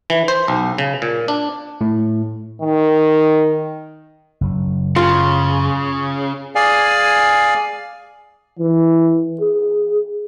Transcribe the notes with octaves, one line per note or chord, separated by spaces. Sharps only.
E3
C5
B1
C#3
A#2
D4
A2
D#3
F#1 F#3
C#3 F4
G#4 D5 F5 G#5
E3
G#4